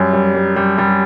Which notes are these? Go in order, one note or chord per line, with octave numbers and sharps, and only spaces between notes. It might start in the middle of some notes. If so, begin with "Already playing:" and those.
Already playing: F#2 G3
G3
G3
G3
G3